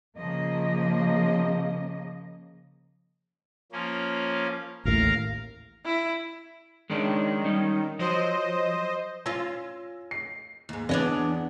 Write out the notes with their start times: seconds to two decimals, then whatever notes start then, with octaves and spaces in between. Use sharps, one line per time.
0.17 C#3 F3 A#3 D#5
3.72 F3 A#3 C#4
4.85 A1 D#2 A2 A#4 F5 A#5
5.85 E4
6.90 D#3 G#3 C#4 D4
7.44 G3 C#4 D#4
7.99 F3 F#3 C5 D#5
9.26 C#4 F4 E6 G#6 A#6
10.11 C7
10.69 D#2 G#2
10.89 E2 B3 D4 C#5 D#5